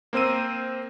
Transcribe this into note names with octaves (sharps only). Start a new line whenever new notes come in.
A#3 C4 C5 E6 D#7